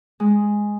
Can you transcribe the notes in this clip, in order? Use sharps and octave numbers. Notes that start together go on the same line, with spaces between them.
G#3